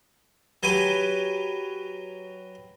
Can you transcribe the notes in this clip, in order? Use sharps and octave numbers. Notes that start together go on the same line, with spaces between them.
F#3 G4 B4 G#5